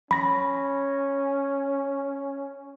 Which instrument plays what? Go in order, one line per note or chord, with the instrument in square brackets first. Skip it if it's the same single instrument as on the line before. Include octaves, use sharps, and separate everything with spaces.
[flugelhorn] C#4 [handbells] B5 A#6